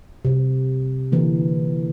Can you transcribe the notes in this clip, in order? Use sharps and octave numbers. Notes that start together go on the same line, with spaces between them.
C3
D3 E3 A#3